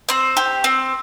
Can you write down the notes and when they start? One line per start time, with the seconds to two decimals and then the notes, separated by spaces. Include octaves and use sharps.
0.09 C4 C5
0.37 G4
0.64 C4